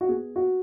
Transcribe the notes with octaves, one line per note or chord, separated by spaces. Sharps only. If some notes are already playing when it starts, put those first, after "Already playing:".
F#4
B3 G#4
F#4